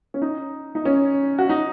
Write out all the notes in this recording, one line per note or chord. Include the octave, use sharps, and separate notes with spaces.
C#4
D#4
D#4
C#4
F#4
D#4